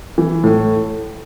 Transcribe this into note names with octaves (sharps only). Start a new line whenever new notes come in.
E3
A2